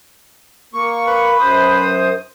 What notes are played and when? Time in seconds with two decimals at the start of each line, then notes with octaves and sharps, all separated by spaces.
0.74 A#3 C#6
1.07 B4 B5
1.39 F#2 C5 D#6